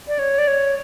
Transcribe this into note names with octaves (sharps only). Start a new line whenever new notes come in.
D5
C#5
D5
C#5